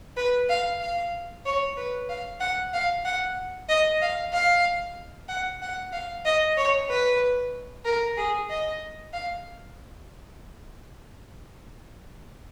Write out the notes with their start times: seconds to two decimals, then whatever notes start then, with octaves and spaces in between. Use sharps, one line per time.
0.17 B4
0.49 F5
0.81 F5
1.45 C#5
1.77 B4
2.09 F5
2.41 F#5
2.73 F5
3.05 F#5
3.69 D#5
4.01 F5
4.33 F5
5.29 F#5
5.62 F#5
5.93 F5
6.25 D#5
6.57 C#5
6.89 B4
7.85 A#4
8.17 G#4
8.50 D#5
9.13 F5